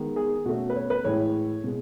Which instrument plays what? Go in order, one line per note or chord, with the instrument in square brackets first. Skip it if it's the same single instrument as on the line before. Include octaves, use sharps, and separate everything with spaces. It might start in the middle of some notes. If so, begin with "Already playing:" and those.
Already playing: [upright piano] D#3 G#3 B3
G#4
B2 A3 C#4 F#4
B4
C#5
B4
A2 E3 G#3 C#5
B2 G#3